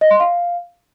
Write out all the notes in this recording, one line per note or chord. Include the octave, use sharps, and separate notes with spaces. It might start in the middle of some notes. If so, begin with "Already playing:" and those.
D#5
C6
F5